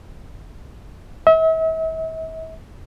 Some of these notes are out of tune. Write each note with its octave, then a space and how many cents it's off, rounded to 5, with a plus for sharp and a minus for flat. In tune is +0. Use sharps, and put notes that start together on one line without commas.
E5 -40